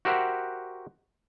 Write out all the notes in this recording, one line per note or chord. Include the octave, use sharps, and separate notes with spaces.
F#4 G4 A#4 C5 E5 F#5